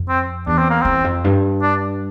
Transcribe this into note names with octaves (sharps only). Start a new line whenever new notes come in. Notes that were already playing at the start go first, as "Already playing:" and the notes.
Already playing: F2
C4
E2 D4
C4
A#3
E2 C4
F2
G2
D4